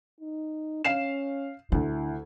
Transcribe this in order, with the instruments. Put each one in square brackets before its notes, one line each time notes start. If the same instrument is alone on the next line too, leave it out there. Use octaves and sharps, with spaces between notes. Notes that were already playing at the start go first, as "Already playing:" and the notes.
[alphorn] D#4
[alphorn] C#4 [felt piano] F5 C7 E7
[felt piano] D2 [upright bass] D3 [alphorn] E4